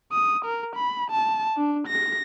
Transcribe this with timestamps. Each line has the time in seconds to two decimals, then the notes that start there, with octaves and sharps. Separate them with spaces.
0.12 D#6
0.45 A#4
0.76 B5
1.11 A5
1.57 D4
1.87 A#6